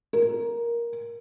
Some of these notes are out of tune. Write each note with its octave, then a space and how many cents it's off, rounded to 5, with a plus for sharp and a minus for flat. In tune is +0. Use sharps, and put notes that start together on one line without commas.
A#4 +10